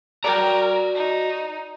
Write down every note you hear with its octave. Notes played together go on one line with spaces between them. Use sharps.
F#4 A#4 D5 G5 A#5
D#4